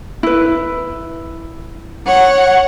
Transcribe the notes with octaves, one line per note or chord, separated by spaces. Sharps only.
E4 B4
C#5 F#5